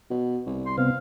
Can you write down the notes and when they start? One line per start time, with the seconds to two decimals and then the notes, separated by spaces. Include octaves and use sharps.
0.10 B2
0.47 C2
0.66 C6
0.78 C3 B3 C4 F5